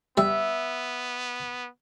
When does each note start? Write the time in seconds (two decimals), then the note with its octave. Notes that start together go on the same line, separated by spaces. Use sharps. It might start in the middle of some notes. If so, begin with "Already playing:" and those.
0.17 G3 B3 E5